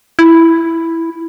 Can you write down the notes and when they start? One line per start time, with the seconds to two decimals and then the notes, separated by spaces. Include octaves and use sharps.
0.19 E4